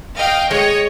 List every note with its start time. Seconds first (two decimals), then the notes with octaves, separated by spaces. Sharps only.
0.16 D#5 F5 G5
0.51 G#3 C#5 D#5